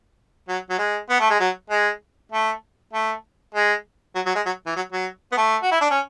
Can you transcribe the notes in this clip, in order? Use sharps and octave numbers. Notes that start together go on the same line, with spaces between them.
F#3
F#3
G#3
B3
A3
G#3
F#3
G#3
A3
A3
G#3
F#3
F#3
G#3
F#3
E3
F#3
F#3
B3
A3
F#4
E4
D4
C#4